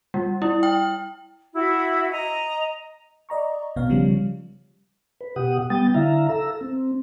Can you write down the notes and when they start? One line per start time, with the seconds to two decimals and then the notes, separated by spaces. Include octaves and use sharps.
0.14 G3
0.42 E4
0.63 G5
1.54 E4 F#4 E5
2.11 D#5 A#5
3.29 D5 D#5 A#5 C#6
3.76 A#1 B2 B3 C#5 F5
3.89 C#3 F3 G3
5.21 B4
5.36 B2 G4 F#5 D#6
5.70 G3 B3 G5 D#6 A6
5.94 D3 E4 E5 F5 A#5
6.29 A4 A#5 E6
6.61 C4